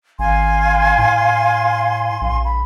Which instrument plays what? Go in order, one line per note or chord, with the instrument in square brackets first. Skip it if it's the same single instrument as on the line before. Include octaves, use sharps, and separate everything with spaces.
[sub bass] G#1 [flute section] F5 G#5 C6
[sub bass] A2
A#1
[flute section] B5